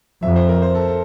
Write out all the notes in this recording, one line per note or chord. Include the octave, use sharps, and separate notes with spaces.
F2 E5
C5
A#4
C5
A4
A4